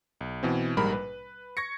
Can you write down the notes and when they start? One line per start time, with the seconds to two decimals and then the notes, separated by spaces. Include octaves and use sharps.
0.21 B1
0.43 B2 E3 C4
0.77 A#1 G#2 G3 A#4 B5
0.93 B4
1.57 C#6 G#6 A#6 C#7